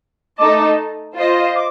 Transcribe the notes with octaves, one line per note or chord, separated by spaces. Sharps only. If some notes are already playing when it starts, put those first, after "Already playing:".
A3 D#4 A4 D#5 A5 D6
F4 C5 D#5
D6